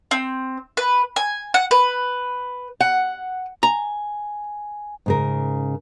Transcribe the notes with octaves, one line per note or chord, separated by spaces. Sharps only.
C4
B4
G#5
F#5
B4
F#5
G#5 A#5
G#2 C#3 A#4